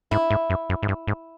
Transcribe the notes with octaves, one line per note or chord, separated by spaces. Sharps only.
G#2 E4
G#2
F#2
F#2
G#2
G2
G#2